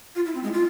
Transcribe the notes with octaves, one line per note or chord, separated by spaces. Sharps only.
F4
E4
C4
G#3
F4